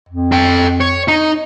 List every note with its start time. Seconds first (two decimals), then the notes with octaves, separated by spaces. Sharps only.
0.09 F2
0.32 A4 G5
0.81 C#5
1.08 D#4